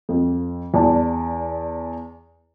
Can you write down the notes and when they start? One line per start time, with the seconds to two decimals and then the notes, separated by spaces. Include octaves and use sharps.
0.09 F2
0.74 E2 D5 A5